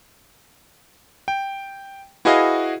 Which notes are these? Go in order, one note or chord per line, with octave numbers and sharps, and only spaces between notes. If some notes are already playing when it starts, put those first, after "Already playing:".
G5
E4 F#4 G#4 B4 D#5 F5